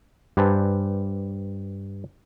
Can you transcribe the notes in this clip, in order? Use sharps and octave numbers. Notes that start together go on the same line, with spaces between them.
G2 G4 B4 C5 G#5 A5